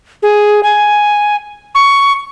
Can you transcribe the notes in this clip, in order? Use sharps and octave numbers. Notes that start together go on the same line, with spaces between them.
G#4
G#5
C#6